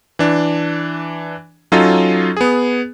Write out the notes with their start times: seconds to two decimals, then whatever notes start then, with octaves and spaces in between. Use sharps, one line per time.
0.19 E3 D4
1.72 F#3 C#4 D#4 F4 A4 D#5
2.37 B3 G#4